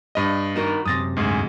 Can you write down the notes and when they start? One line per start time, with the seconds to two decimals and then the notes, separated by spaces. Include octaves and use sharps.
0.15 G2 D#5
0.56 D#4 F#4 A#4
0.85 F#2 C3 D#6 A6 A#6
1.16 D2 G#2 G#4